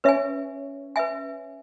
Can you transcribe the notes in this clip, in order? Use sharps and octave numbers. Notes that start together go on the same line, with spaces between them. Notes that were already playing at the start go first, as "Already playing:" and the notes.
C#4 B4 E5 G#5
B4 E5 G#5